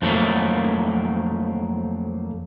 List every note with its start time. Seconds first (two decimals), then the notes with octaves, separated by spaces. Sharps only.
0.02 F2 D#3 F#3 A3 A#3